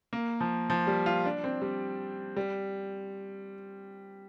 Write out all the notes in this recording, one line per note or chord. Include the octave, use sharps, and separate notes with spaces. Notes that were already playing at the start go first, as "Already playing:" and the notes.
A#3
F3
F3
G3
F4
D4
C4
G3
G3